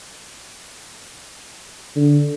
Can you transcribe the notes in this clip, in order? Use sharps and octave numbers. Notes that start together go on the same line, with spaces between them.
D3